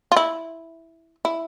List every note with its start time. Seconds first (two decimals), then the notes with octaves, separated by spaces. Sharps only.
0.12 F4
0.16 E4
1.25 E4